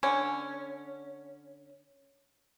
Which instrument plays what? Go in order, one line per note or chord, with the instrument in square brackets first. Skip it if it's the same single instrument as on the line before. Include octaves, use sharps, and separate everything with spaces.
[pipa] D3 C#4